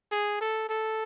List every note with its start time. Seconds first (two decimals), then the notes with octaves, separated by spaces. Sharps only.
0.11 G#4
0.41 A4
0.69 A4